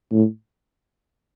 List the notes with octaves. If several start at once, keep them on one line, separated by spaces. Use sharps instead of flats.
A2